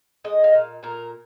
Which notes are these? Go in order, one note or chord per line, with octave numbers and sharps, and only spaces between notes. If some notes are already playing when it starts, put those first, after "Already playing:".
G#3 D#5
F5
A#2
A#2 A#4